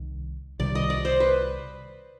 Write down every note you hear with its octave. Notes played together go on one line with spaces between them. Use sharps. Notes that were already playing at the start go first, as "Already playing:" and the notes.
Already playing: C2 D#3
C2 C3 D#3 G3 D5
D#5
D5
C5
B4